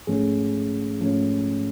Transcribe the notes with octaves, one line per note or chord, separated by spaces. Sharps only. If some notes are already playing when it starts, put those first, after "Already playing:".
G#2 F3 A3 C#4 G#4
G#2 F3 A3 C#4